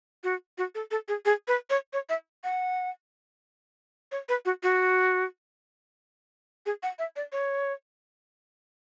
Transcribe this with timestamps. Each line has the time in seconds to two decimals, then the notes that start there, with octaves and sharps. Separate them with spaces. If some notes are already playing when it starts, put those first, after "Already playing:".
0.24 F#4
0.58 F#4
0.75 A4
0.91 A4
1.08 G#4
1.25 G#4
1.48 B4
1.70 C#5
1.93 C#5
2.09 E5
2.44 F#5
4.12 C#5
4.29 B4
4.45 F#4
4.63 F#4
6.66 G#4
6.83 F#5
6.99 E5
7.16 D5
7.32 C#5